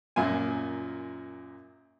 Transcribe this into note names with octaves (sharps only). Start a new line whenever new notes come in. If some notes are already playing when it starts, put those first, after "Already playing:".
F#2 A#2 F4 G#5